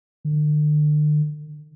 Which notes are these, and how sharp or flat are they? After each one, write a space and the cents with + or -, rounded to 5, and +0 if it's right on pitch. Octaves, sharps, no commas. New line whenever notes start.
D3 +40